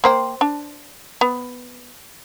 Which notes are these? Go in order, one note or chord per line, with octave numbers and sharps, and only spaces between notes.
A#3 C5 G5
D4
B3